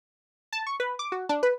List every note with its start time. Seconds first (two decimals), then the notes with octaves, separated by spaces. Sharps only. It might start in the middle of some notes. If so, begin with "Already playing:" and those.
0.53 A5
0.67 C#6
0.80 B4
0.99 D6
1.12 F#4
1.29 D4
1.43 B4